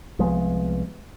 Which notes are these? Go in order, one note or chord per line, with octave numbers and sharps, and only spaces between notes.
C2 F3 G#3 B3